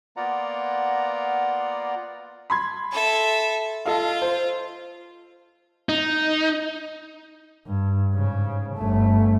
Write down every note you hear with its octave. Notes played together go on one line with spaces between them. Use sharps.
A#3 B3 F4 D5 F#5 A#5
B5 C6 G#6
A4 E5
F4 A4 D#5 F5
C5
D#4
G2
G#2 C#3
G1 A3